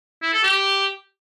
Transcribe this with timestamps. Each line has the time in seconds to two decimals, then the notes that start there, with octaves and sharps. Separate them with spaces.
0.22 E4
0.33 A4
0.44 G4